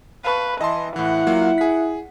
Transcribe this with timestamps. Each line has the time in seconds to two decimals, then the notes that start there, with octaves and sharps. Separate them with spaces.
0.24 B4 F5 A5 C#6
0.61 E3 D#5 A5 C6
0.96 A2 E3 E4 F#5
1.27 F#3 A#3 F4
1.58 G#4 B6